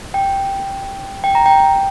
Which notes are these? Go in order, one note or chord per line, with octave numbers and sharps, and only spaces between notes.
G5
G5
A#5
G5